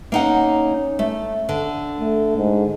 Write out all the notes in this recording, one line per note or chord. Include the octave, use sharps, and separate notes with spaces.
A#3 C#4 D#4 F#5
A3
D3
A3
G#2